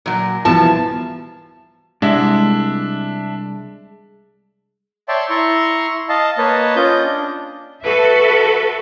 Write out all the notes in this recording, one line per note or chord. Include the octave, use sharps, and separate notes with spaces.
A#2 F#3
C2 B2 E3 F3 B3 A5
C2 G#3 D4 E5
C#5 D5 E5 G5 A5 C6
E4 A#5 C6 C#6
D#5 F5 A5
A#3 B4 C#5 D#5 A5
C#4 F4 D#5 G6
D4
F#4 A4 B4 E5